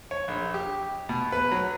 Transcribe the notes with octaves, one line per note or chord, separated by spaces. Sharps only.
C#5
A#1
G4
B2
B4
F#3